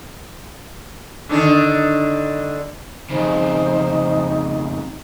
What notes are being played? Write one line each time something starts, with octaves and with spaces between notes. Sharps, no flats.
D3 D#3 D4
F2 C#3 D#4 C5